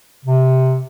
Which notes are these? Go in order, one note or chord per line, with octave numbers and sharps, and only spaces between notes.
C3